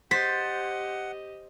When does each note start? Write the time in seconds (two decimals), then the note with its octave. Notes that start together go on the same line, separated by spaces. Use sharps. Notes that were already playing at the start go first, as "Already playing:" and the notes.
0.11 G4 C5 D#5 F#5 A6 B6